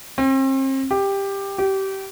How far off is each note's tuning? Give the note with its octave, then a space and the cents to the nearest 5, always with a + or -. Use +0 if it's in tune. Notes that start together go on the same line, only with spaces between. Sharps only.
C4 +40
G4 +10
G4 -25